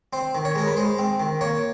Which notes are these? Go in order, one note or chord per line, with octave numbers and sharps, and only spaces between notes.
C4 C5
D#3
C#5
G#3 A#4
B4
G#3 C5
C4
D#3
A#3 C#5